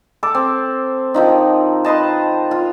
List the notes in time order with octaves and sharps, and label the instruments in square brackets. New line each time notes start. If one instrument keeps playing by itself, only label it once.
[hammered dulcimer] A4 D6
C4
D#3 F3 D#4
B4 C5 D#5 A5
F4